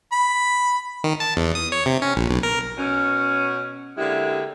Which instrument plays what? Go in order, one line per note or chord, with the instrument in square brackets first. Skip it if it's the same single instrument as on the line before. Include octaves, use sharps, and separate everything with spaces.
[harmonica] B5
[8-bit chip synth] D#3
A5
E2
D#6
C#5
C3
C#4
A#1
B1
A#4
[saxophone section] B2 B3 C#4
D3 G#3 A#3 E4 G4